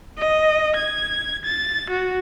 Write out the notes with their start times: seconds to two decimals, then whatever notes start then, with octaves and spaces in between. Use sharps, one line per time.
0.18 D#5
0.76 G#6
1.45 A6
1.90 F#4